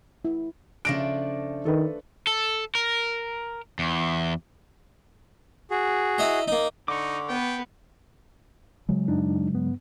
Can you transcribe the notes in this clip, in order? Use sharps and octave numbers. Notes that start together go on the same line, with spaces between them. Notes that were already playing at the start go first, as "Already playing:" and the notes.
E4
C#3 F3 A3 D4 A#6 D7
D#3 A4 B4
A4
A#4
E2
F#4 G#4
E4 D#5 A#5
A#3 D#4
D3 D#4 C#6 D6
B3 B4 G5
C#3 F#3 G#3
F#2 D4 D#4
G2 B3